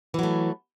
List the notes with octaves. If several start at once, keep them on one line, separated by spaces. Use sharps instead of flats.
E3 F#3 A3